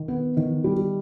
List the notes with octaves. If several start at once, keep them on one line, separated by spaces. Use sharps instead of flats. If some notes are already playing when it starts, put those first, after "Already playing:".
Already playing: D#3
B3
D#3
G3